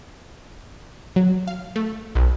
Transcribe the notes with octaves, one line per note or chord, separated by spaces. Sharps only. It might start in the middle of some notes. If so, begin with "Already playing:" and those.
F#3
F5
A3
B1